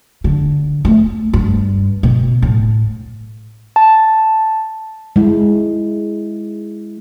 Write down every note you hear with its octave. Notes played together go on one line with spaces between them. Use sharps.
D3
A3
G2
B2
A2
A5
G#3 E4